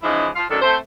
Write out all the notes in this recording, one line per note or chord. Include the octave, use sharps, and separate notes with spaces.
C#3 E3 F3 G#3 D#4 E4
F3 F4 F5
F#2 A2 D#3 D4 A4
A3 C4 C5